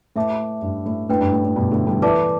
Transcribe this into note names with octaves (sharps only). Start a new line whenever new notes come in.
A2 B4 E5 A5 D6
G2
A2
A2 D4 B4 G5
G2
A2
A2
G2 B2
A2 D3
D3 G3
E3 A3 B4 D5 A5 D6